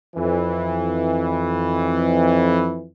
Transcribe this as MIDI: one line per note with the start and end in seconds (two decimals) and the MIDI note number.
0.16 2.87 41
0.16 2.87 52